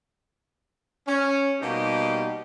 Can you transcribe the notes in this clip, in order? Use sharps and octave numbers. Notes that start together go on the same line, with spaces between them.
C#4
B2 G3 A#3 D#4 G4